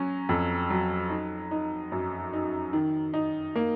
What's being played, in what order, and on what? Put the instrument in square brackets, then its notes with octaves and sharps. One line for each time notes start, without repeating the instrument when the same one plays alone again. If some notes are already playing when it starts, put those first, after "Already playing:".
Already playing: [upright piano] F#3 C#4
F2
F#3
D#4
D#4
F#2
D#4
D#3
D#4
A#3